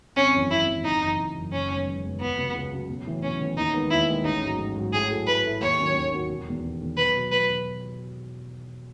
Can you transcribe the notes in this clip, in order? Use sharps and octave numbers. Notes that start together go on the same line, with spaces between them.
G#1 C#4
F#2 E3
G#1 E4
F#2 E3
F#1 D#4
F#2 E3
F#1
F#2 E3
F#1 C#4
F#2 D#3 G#3 B3
F#1
F#2 D#3 G#3 B3
C#2 B3
C#3 F#3
C#2
C#3 F#3
B1
A2 E3
B1 C#4
A2 E3
D#2 D#4
D#3 G#3 B3 D#4
D#2 E4
D#3 G#3 B3 D#4
A1 D#4
G#2 F#3
A1
G#2 F#3
A2 G#4
F#3 A3 E4
A2 B4
F#3 A3 E4
D#2 C#5
D#3 F#3 C#4 F#4
D#2
D#3 F#3 C#4 F#4
E1
E2 D#3
E1
E2 D#3
B1 B4
B2 F#3
B1 B4
B2 F#3